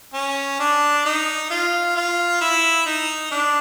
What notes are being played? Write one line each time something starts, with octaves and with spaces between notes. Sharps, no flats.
C#4
D4
D#4
F4
F4
E4
D#4
D4